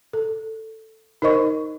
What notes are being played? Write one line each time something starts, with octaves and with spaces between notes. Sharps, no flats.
A4
D#4 A#4 C5 D#5 C#6